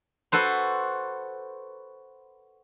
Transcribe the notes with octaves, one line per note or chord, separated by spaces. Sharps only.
F#4 A4 B4 C5